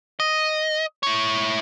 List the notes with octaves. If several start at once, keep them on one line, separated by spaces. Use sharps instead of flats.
D#5
E4 C#5